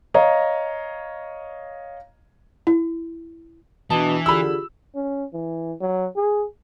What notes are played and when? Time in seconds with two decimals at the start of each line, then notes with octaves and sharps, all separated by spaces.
0.14 C#5 D#5 F5 A#5
2.67 E4
3.90 B2 E3 D4 A5 D#6
4.26 D3 F4 G4 G#4 B5 E6
4.95 C#4
5.33 E3
5.80 F#3
6.17 G#4